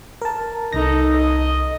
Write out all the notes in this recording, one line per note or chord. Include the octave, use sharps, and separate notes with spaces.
A#4 A5
C2 D#4 A4 A#6
D#5